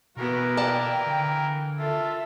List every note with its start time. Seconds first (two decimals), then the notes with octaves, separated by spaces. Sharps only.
0.17 B2 E3 B3 F#4 A#4
0.57 A#3 D5 G5 A5
1.07 D3
1.78 F4 A4 E5